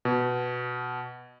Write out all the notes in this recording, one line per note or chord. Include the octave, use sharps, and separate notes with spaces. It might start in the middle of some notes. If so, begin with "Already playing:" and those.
B2